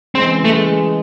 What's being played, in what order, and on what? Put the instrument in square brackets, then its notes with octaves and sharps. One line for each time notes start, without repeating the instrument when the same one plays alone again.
[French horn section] C#3 E3 G#3 [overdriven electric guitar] C4
[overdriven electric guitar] A3